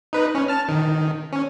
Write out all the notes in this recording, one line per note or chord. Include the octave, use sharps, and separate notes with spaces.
D#4 B4
C#4
A5 F6
D#3
C#4